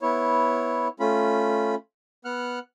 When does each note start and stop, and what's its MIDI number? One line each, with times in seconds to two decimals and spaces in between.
0.01 0.88 59
0.01 0.88 64
0.01 0.88 73
1.00 1.75 57
1.00 1.75 61
1.00 1.75 65
1.00 1.75 83
2.25 2.59 59
2.25 2.59 78
2.25 2.59 89
2.25 2.59 90